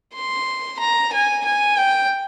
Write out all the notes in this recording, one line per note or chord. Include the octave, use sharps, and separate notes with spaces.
C6
A#5
G#5
G#5
G5